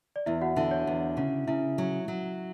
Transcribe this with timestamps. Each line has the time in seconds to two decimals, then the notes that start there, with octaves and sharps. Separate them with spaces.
0.16 D5
0.26 E2 E4 E5
0.41 F#4 F#5
0.56 D3 E4 E5
0.71 C#5
0.87 E2
1.17 C#3
1.47 C#3 E4 E5
1.78 F#3
2.08 F#3